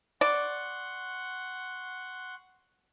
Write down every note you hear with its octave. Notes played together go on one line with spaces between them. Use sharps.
D5 F#5 C6 C#6